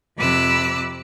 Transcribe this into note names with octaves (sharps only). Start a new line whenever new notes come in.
F2 C3 B5 D6 E6 F#6